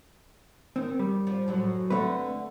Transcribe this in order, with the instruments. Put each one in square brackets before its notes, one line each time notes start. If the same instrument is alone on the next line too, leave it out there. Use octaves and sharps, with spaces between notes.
[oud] D#3 [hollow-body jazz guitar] C4
[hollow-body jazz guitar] G3
[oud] F3
F#2 A2 F#3
[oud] D3 [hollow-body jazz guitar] A3 C4 B4